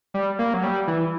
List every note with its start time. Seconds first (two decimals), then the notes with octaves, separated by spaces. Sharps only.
0.14 G3
0.39 A#3
0.54 F#3
0.63 G3
0.87 E3